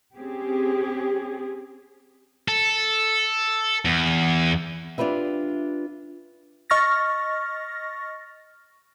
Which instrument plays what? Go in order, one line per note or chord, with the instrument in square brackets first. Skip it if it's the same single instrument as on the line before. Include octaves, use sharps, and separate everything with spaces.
[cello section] C4 C#4 G4 G#4
[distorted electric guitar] A4
E2
[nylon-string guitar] D4 F4 G4 B4 E5
[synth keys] D#5 C#6 F6 A6 A#6